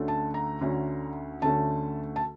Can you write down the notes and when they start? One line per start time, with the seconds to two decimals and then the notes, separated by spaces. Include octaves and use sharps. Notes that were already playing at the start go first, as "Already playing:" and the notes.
Already playing: D2 D3 A3 C#4
0.08 A5
0.34 A#5
0.61 D2 D3 A3 C#4
1.42 D2 D3 A3 C#4 A5
2.16 A5